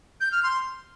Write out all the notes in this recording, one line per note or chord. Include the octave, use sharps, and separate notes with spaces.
G6
F6
C6